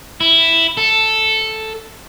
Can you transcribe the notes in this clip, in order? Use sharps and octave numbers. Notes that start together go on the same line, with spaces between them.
E4
A4